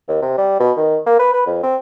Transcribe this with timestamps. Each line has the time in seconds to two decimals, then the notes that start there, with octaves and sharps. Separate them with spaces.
0.08 D#2
0.22 C3
0.38 G3
0.60 B2
0.77 D#3
1.07 A#3
1.19 B4
1.34 B4
1.47 F2
1.63 C4